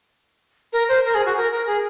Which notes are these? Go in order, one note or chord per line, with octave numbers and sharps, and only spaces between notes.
A#4
C5
A#4
G#4
F#4
A#4
A#4
G#4